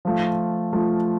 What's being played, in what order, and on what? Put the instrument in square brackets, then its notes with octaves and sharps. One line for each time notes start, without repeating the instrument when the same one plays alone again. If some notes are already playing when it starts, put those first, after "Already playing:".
[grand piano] F3 A3 F4
F3 A3 F4